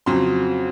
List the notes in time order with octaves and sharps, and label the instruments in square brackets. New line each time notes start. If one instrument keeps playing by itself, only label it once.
[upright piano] F2 C#3 F#3 C6